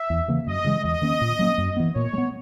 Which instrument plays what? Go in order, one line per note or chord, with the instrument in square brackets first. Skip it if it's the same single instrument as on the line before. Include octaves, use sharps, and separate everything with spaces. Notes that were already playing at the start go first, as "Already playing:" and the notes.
Already playing: [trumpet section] E5
[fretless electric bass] E2
C#3 E3 A#3
[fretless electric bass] F#2 [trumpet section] D#5
[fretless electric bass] C#3 E3 G#3
[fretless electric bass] E2 [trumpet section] D#5
[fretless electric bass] D#3 A#3 C#4
A#2
F#3 A#3 C#4
F#2
E3 B3
[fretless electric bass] A#2 [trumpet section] C#5
[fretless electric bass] G#3
B3